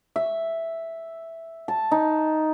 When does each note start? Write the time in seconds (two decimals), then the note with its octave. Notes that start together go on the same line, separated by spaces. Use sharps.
0.16 E5
1.68 A5
1.91 D#4